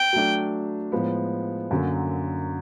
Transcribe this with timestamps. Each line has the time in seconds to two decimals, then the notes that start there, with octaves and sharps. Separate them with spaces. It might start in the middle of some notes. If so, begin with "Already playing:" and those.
Already playing: G5
0.13 F#3 A3 D4
0.92 A2 F3 G#3 B3
1.71 F#2 D3 F#3 A#3